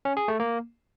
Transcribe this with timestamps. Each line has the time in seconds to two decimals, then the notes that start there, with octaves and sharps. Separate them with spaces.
0.05 C#4
0.17 G#4
0.28 A3
0.40 A#3